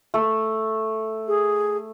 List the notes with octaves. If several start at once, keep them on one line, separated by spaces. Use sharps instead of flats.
A3
G#4